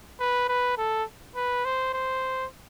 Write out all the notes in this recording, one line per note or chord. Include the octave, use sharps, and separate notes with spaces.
B4
B4
A4
B4
C5
C5